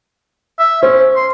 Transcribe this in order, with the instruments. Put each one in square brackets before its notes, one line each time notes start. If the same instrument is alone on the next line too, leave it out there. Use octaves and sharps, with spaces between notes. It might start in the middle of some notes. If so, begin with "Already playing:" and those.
[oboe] E5
[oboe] C#4 [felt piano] C5
[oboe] C6